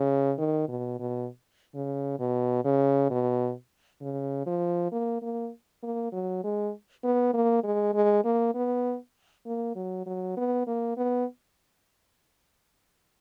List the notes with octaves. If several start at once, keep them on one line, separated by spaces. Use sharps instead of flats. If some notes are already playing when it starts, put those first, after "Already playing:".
Already playing: C#3
D#3
B2
B2
C#3
B2
C#3
B2
C#3
F3
A#3
A#3
A#3
F#3
G#3
B3
A#3
G#3
G#3
A#3
B3
A#3
F#3
F#3
B3
A#3
B3